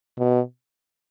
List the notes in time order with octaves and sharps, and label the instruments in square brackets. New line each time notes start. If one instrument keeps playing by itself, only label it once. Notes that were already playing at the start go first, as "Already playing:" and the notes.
[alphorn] B2